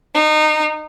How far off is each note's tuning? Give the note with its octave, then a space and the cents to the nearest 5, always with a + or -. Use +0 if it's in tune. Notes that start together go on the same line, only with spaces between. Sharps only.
D#4 -25